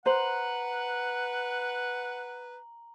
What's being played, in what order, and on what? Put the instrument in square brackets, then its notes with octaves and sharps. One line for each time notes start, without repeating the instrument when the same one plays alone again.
[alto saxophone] B4 [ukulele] C5 [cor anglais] F#5 [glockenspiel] A#5 F#7